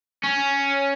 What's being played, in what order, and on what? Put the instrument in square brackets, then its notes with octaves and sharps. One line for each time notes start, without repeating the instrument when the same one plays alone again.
[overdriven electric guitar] C#4